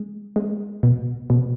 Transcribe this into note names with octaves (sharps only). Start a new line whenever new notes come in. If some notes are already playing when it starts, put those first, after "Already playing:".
Already playing: G#3
G#3
B2
B2